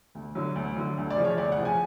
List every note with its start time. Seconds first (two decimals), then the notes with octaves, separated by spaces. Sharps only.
0.15 D2
0.35 D3 F#3
0.55 D2
0.76 D3 F#3
0.97 D2
1.10 D5
1.17 C#3 F3
1.24 C#5
1.38 D2 D5
1.52 F#5
1.58 C#3 F3
1.65 G#5